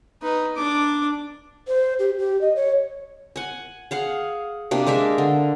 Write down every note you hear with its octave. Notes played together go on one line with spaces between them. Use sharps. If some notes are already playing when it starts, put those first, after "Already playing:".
D#4 B4
D4 D6
C5
G4
G4
D#5
C#5
F#5 G#5
G#4 F5 F#5
C3 A#3 D4
G#3 D4 A#4 E5
D3